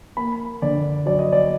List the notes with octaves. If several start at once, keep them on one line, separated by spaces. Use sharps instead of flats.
A#3 B5
D3 D5
F#3 D5
D#5
D5